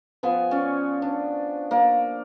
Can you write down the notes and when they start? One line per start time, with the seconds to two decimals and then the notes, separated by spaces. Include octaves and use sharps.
0.23 F3 B3 G#5
0.51 C#4 C#5 D5
1.02 D4
1.71 A#3 D5